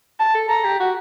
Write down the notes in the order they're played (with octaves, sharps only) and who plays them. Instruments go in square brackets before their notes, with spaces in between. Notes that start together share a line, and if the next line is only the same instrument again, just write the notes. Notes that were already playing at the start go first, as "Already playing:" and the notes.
[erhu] A5
[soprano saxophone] A4
[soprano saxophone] A4 [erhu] A#5
[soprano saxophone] G4
F#4